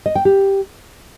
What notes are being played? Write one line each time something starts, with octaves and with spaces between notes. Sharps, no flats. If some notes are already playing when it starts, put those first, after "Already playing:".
D#5
G5
G4